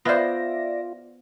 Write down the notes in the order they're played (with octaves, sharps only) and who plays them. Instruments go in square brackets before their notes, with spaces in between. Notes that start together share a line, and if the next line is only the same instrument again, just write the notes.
[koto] B3 C5 [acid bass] F4 [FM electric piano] D5 E5 A#6